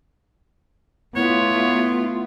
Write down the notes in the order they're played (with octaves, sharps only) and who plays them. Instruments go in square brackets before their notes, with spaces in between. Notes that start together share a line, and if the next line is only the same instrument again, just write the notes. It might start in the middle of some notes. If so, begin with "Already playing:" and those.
[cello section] A3 F4 [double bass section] B3 [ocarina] E4 [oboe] C#5